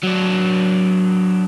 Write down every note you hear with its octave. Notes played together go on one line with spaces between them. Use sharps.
F#3 D4